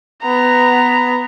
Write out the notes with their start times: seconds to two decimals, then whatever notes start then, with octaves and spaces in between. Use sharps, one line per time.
0.22 B3 A#5